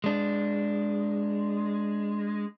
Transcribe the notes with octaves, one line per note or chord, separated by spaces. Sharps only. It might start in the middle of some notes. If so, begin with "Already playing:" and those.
G#3 D4